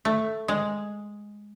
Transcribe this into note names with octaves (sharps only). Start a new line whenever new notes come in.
A3
G#3